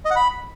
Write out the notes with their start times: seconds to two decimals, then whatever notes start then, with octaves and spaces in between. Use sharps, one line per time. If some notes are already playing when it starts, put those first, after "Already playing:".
0.05 D#5
0.10 F#5
0.16 B5